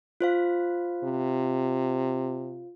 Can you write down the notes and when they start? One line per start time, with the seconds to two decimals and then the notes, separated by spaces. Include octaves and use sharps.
0.21 F4 C5 F5
1.04 C3